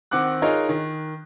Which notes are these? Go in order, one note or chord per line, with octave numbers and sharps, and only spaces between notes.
D#3 C4 F#5 D6 F#6
D#4 F4 G#4 A#4 C#5 D#5
D#3